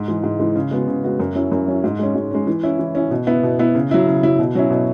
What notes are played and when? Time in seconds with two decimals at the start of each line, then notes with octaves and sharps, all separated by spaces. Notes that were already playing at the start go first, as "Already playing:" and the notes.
Already playing: G#2
0.08 E3 G#3
0.23 G#2
0.39 E3 G#3
0.55 C#3
0.71 G#3 B3 F#4
0.88 C#3
1.04 G#3 B3 F#4
1.20 F#2
1.35 F#3 C#4 E4
1.52 F#2
1.68 F#3 C#4 E4
1.84 G#2
1.99 G#3 C#4
2.15 G#2
2.31 G#3 C#4
2.47 E3
2.63 C#4 E4
2.79 E3
2.95 C#4 E4
3.11 B2
3.27 B3 E4
3.43 B2
3.59 B3 E4
3.75 C#3
3.91 F#3 E4
4.07 C#3
4.23 F#3 E4
4.39 B2
4.55 F#3 C#4 E4
4.70 B2